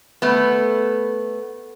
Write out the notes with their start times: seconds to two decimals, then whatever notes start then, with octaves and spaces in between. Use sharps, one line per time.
0.22 A3 B3